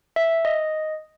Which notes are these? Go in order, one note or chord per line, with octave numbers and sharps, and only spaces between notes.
E5
D#5